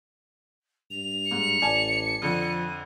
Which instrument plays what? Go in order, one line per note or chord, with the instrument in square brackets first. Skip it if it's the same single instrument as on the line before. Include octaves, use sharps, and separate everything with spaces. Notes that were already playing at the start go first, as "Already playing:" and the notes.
[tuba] G2 [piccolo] F7
[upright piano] G#2 [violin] C#7
[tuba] A1 [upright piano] D5 G#5 A5
[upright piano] F2 D3 [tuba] F3 [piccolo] D#7